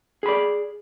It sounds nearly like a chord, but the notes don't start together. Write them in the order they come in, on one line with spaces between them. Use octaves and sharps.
G#4 B5 D5